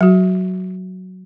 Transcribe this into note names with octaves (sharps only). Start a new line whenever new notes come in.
F#3 F#4